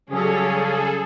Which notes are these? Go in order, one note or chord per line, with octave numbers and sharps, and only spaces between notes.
C#3 F#3 G3 C#4 G#4 A4